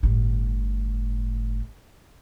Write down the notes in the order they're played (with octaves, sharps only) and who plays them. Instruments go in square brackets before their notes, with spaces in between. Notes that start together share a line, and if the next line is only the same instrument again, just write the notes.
[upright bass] G1 A2